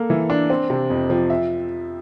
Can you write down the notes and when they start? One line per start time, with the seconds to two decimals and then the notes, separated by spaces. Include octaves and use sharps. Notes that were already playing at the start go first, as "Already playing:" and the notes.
Already playing: A#3 A4
0.10 E3
0.30 D4
0.50 C4
0.70 C3
0.90 F2
1.10 F3
1.30 E5